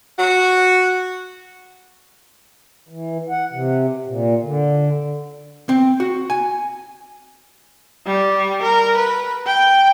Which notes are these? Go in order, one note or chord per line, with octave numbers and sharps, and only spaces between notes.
F#4
E3
F#5
C3
A#2
D3
C4
F#4
G#5
G3
A#4
B4
G5